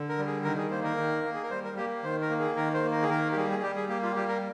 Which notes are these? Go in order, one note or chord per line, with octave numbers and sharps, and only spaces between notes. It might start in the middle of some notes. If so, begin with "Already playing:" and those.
Already playing: D3
A#4
G3
G#4
D#3 A#4
G#4
A#3 C5
A#4
D#3
A#3
G#4
A#4
G3 C5
A#4
A#3 G4
D#3 C5
A#4
A#3
G#4
D#3 A#4
C5
A#3
A#4
G#4
D#3 A#4
G4
G3 G#4
G#4
G3 G4
G#4
A#3 G4
F4
G3 G4
A#4